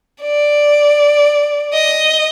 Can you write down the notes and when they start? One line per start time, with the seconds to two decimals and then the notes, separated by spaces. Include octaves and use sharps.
0.23 D5
1.74 D#5